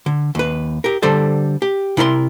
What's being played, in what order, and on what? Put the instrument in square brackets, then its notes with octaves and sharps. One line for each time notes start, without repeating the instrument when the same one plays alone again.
[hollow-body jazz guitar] D3
D#2 B4
G4 A#4
D3 G3 A4 C5 D5
G4
C3 E4 A#4 C#5 C6